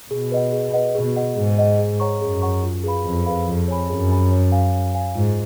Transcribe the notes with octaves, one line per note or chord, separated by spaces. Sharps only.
B2 G#4
B4 D#5 F#5
G#4
B4 D#5 F#5
B2 G#4
D#5 F#5
G#2 G#4
D#5 F#5
G#4
C#5 F#5 A#5 C#6
F#2 G#4
C#5 F#5 A#5 C#6
F4
G#4 B4 F5 B5
F2 F4
G#4 B4 F5 B5
F2 G#4
C#5 G#5 B5
F#2 G#4
C#5 G#5 B5
C#5
F5 G#5
C#5
F5 G#5
G#2 F4